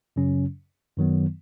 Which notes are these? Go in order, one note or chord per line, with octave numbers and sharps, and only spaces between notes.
F#2 C#3 F#3 C#4
F#2 D#3 F#3 B3